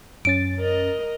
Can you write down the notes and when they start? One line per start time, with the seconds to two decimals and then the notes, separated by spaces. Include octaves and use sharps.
0.25 F#2 C#4 A6 D7
0.59 A#4 D#5